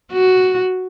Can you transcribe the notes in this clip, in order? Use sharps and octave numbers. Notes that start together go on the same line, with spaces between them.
F#4